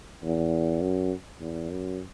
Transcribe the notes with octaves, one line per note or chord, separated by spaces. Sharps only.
E2
F#2
E2
F#2